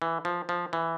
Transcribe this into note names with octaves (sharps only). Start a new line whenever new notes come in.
E3
F3
F3
E3